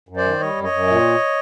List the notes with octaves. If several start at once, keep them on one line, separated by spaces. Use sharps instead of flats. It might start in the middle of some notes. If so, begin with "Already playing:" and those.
F#2
C5 D5
D#3
G3 C#5 D#5
F#2
C#5 D#5
F#2
A#2